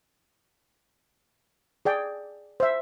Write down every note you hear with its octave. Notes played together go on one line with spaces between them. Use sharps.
G#4 D5 G5
C5 E5